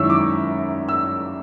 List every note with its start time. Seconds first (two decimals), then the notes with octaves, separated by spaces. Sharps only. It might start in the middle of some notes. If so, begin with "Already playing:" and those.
Already playing: F#2 D#3 G#3 C#4 E4 C#6 E6
0.10 D6
0.89 E6